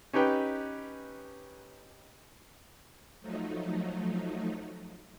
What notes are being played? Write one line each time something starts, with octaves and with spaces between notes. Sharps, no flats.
C#4 D#4 G4 B4 G5
F3 F#3 A3 D#4